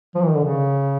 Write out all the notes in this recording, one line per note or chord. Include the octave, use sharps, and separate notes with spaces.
F3
E3
D#3
D3
C#3